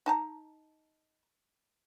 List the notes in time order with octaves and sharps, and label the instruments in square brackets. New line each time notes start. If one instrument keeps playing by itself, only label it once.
[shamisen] D#4 A5 A#5